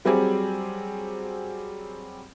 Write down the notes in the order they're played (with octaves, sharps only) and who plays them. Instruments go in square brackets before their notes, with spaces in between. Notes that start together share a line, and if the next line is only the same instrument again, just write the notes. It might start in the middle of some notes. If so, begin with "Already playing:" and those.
[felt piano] F#3 G3 C4 G4 G#4